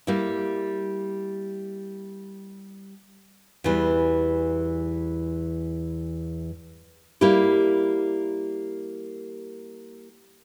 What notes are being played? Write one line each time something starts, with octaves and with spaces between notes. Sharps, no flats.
G3 A#3 E4
E2 E3 G3
G3 A#3 E4 G4